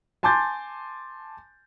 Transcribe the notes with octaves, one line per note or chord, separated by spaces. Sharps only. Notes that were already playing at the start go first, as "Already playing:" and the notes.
G#5 A5 C6 D6 G6 A6